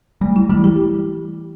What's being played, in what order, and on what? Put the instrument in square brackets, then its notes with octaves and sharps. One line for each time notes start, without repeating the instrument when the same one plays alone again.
[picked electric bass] G3 [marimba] A3
[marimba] E4
[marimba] E3 [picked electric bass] G3
[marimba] G4